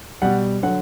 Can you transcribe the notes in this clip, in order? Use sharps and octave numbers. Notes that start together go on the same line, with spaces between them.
B2 G3 F#5
D3 F#3 F#5